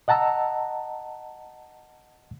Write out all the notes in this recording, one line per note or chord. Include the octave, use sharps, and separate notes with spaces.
D#5 F#5 A5 A#5 E6